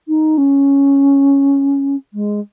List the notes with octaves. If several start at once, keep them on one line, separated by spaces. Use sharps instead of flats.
D#4
C#4
G#3